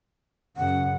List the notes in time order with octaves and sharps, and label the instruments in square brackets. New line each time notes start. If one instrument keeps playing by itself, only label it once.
[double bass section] F#2 C#3 [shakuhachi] F#5